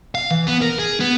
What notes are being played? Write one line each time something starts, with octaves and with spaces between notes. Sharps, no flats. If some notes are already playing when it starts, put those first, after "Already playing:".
F5
E3
B3
A#4
G#4
B3